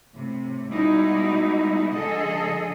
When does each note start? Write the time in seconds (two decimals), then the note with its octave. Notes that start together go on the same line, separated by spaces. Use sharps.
0.17 A2 C3
0.71 B2 G3 G#3 D#4 E4 F#4
1.92 D3 F3 G#3 G#4 A4 D#5